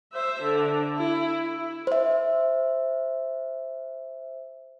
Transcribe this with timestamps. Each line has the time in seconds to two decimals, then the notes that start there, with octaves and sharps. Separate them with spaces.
0.13 C5 E5
0.42 D3
0.96 E4
1.43 E4
1.87 C5 E5